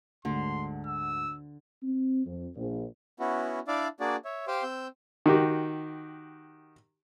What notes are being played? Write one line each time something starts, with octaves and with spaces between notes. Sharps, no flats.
D2 G#2 D3 C6
E6
C4
F2
A#1
B3 C#4 E4 F#4
D4 E4 D5 E5 F5 D6
A#3 D4 F#4 G#4 D5
C#5 E5
G4 C5 F5 G5 C6
C4 E6 G6
D#3 F#4 G4